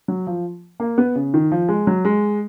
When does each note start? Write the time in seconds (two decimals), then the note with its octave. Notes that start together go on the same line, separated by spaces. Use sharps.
0.08 F#3
0.27 F3
0.80 A#3
0.98 B3
1.16 C#3
1.34 D#3
1.52 F3
1.69 G#3
1.87 F#3
2.05 G#3